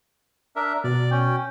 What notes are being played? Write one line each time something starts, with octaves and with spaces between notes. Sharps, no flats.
D4 A#4 E5
B2 D5
C#4 G5